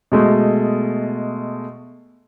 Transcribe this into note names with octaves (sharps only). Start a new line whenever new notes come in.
B2 G#3 A3